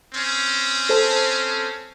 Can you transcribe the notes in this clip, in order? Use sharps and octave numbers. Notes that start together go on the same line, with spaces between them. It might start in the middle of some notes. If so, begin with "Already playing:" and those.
C4 C#4
A4 C5 A5